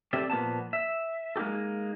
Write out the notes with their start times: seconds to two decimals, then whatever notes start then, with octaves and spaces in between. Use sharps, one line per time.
0.13 C4 G4 A4 D5 E5
0.30 A#2 F3 A#3 B3 A5
0.73 E5
1.36 G#3 A#3 D#4 G4 A4